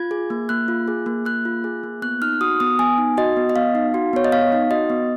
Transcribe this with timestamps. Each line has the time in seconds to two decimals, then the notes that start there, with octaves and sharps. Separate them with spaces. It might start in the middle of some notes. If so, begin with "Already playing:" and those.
Already playing: F4 G#6
0.11 G#4
0.30 A#3
0.49 A#3 F#6
0.68 F4
0.88 G#4
1.06 A#3
1.25 A#3 F#6
1.45 F4
1.64 G#4
1.83 A#3
2.02 B3 F#6
2.21 D#4 F6
2.41 F#4 D#6
2.60 B3 D#6
2.79 B3 G#5
2.98 D#4
3.17 F#4 D#5
3.37 B3
3.49 D#5
3.56 B3 F5
3.75 D#4
3.94 F#4
4.13 B3 C#5
4.24 D#5
4.32 B3 F5
4.52 D#4
4.71 F#4 D#5
4.90 B3